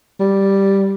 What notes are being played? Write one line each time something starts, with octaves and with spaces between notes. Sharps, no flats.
G3